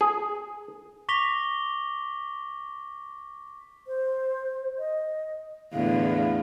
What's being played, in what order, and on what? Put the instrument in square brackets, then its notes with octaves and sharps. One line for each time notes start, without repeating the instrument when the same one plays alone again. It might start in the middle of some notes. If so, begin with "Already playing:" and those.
[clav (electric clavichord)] G#4
[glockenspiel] C#6 D6 A#6 B6 F7 G7
[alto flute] C5
D#5
[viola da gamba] E2 A2 D3 [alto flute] F5